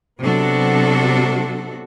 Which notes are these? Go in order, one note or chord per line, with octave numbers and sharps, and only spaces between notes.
C3 F#3 B3 D4 F#4 A4